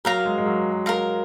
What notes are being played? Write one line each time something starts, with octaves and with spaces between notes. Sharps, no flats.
F#3 A#4 F5 A#5
G#3
G#3
F#3
A#4 F5 A#5